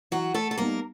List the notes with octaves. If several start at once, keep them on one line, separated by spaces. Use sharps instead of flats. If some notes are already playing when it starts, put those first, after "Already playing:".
E3 F#3 F#4
A3 A4
A4
G3 A#3 B3 D#4 A#4